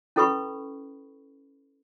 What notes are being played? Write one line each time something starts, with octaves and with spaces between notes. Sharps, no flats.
C#4 E4 A4 B4 B5 C#6